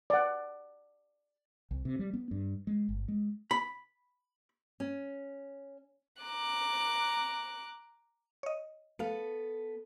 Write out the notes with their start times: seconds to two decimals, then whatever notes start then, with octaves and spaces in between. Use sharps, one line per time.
0.10 D5 F#5
1.71 C2
1.85 C3
1.99 G3
2.14 B3
2.31 G2
2.67 G#3
2.89 G1
3.08 G#3
3.51 B5
4.80 C#4
6.23 A#5 D6 F#6
8.43 C#5 D#5
8.99 A3 B3 A4 B4 F5